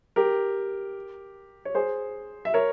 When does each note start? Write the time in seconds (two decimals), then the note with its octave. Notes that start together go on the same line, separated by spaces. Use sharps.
0.16 G4 A#4
1.65 C#5
1.75 G#4 C5
2.45 E5
2.54 A#4 C#5